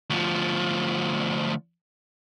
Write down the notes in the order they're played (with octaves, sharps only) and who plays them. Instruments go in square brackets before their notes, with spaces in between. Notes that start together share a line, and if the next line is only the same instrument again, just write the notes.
[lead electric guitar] D2 F3